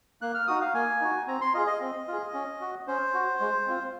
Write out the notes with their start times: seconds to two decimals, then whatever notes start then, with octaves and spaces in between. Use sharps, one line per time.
0.22 A#3 F#6
0.34 F6
0.47 D#4 F#4 D#6
0.61 F5
0.74 A#3 G#5
1.01 D#4 F#4
1.27 C4 A#5
1.41 C6
1.54 F4 G#4 D#5
1.67 D#5
1.81 C4
2.08 F4 G#4
2.34 C#4
2.61 F#4
2.87 C#4 C5
3.14 F#4
3.40 G#3
3.66 C4 F4